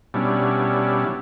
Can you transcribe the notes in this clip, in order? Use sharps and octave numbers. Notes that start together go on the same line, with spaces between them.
B2 G3 C#4 D4 E4